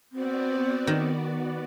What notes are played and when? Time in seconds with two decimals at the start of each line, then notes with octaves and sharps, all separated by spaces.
0.12 B3 C4 F#4 D5
0.87 D#3